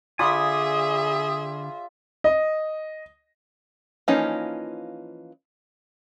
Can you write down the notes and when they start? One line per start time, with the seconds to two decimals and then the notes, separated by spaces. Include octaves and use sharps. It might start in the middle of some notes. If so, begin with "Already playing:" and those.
0.19 D3 F4 G#4 D5 E5 G#5 B5 D#6
2.24 D#5
4.08 E3 F3 A#3 C#4 D#4